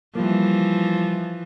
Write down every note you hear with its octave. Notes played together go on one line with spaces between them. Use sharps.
E3 F3 G3 A#3